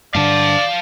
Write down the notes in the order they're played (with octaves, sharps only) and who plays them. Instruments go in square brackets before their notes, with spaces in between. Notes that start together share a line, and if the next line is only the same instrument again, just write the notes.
[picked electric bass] G2 D3 [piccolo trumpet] D5 [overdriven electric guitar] F5 A5